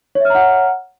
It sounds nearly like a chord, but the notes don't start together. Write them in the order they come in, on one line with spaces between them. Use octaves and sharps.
C#5 E5 F6 A#5 F#5